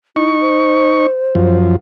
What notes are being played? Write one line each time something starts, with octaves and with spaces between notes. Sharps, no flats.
D#4 E4 C#6
C5
F#2 F3